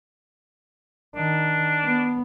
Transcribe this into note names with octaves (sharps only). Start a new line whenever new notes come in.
D#3 D4
B3